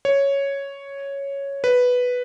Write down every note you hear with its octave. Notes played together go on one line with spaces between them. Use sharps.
C#5
B4